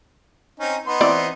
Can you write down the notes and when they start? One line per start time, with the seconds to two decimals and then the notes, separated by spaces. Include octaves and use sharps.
0.60 C4 C#4 D#4
0.86 B3 D#4 C6
1.01 E3 C4 D5